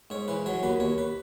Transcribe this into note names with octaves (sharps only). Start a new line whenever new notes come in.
G#2 C#5
E3 B4
F#3 C#5
D#2 B4
D#2 C#5
B4